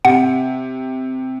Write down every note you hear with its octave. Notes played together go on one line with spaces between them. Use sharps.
C3 F#5